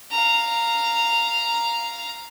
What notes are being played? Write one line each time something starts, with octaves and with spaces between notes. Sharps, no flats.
F5 A#5